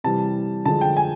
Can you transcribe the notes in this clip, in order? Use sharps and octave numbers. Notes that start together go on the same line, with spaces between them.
C3 E3 G3 A5
D3 F3 G#3 A5
G5
G#5